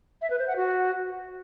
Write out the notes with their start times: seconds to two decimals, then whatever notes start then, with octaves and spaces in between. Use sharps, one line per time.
0.22 E5
0.30 B4
0.39 C5
0.48 F#5
0.56 F#4